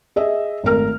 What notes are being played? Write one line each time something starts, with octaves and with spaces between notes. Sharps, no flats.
G#4 D#5 E5
G#1 A3 A#4 F6